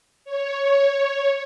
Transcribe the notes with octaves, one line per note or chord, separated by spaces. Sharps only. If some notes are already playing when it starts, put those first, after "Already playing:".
C#5